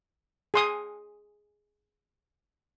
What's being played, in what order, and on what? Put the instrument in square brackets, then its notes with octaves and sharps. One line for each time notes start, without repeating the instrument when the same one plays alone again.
[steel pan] G#4 C6 D#6